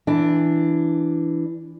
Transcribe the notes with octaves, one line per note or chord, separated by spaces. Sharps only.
E3 D4